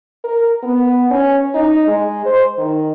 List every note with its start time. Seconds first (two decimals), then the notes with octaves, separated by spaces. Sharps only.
0.24 A#4
0.63 B3
1.11 C#4
1.54 D#4
1.87 G#3
2.26 C5
2.58 D#3